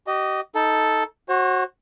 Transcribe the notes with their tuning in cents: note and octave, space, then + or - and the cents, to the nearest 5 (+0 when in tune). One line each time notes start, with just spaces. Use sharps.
G4 -40 D#5 -10
D#4 +15 A4 +0
F#4 +0 C5 +45